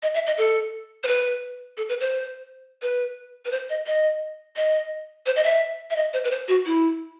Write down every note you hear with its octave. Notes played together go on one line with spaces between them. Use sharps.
D#5
E5
D#5
A4
C5
B4
A4
B4
C5
B4
B4
C5
D#5
D#5
D#5
C5
D#5
E5
E5
D#5
C5
B4
C5
F#4
E4